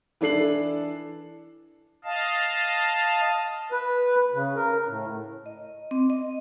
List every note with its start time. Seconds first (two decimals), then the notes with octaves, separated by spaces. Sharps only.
0.21 E3 D4 A4 C7 F#7
2.04 D#5 F5 A5
3.72 B4
4.34 C#3
4.56 A#4
4.87 A2
5.46 D#5
5.91 C4
6.10 D#5